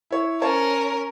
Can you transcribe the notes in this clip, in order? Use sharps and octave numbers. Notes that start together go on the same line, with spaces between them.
E4 C#5
C#4 A#4 C5 C#5 A5